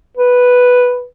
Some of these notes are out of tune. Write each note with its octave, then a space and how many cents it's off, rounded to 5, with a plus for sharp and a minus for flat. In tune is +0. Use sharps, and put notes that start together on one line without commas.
B4 -5